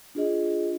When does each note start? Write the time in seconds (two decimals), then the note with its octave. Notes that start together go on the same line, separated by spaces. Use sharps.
0.15 D4 F4 G#4 D#5